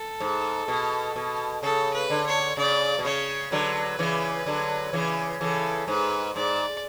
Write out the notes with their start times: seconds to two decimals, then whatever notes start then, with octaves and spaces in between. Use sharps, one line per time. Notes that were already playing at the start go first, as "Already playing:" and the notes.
Already playing: A4
0.20 G#2
0.68 B2
1.16 B2
1.63 C#3 A4
1.94 B4
2.10 D3
2.26 C#5
2.57 C#3 D5
2.99 B2
3.05 C#3 C#5
3.52 D3 F#3 B4
3.99 C#3 E3
4.46 D3 F#3
4.93 C#3 E3
5.40 C#3 E3 A4
5.88 G#2 B4
6.36 G#2 D5